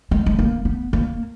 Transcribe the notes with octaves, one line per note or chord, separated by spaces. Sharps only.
G#3
G#3
A#3
B3
A#3